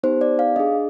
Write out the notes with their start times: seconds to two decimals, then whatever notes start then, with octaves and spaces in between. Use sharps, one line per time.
0.03 B3 D#4 G4 C5
0.21 D5
0.39 F5
0.56 D4 G#4 D#5